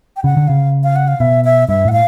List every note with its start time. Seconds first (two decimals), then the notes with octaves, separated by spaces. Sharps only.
0.17 G5
0.24 C#3 F#5
0.37 D3
0.48 C#3 F5
0.84 F5
0.96 F#5
1.08 F5
1.20 B2 E5
1.45 E5
1.68 G2 E5
1.85 A2 F#5
1.93 F5